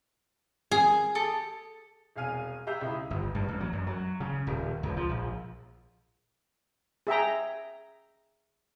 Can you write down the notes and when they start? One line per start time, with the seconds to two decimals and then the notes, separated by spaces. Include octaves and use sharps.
0.71 G#4
1.15 G4 A4 D#6
2.16 E1 C2 F5 G#5 F6 D#7
2.67 G4 E5 F5 A#5 E6 G6
2.81 C#2 E4 D#6
3.10 G1
3.35 G2
3.48 A1
3.60 F#3
3.73 F#2
3.87 F#3
4.20 C#3
4.47 D#1
4.83 C#2
4.97 F3
5.09 A#1
7.07 G#4 E5 G5 A#5